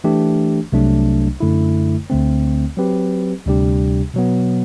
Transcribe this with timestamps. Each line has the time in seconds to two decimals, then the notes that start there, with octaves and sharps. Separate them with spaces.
0.04 E3 A3 D4 G4
0.72 C2 C3 F#3 A3 D4
1.40 F#2 D3 A3 E4
2.10 D2 D3 A3 C4
2.77 F#3 C4 G4 B4
3.46 D2 C3 G3 D4 G4
4.14 B2 F#3 B3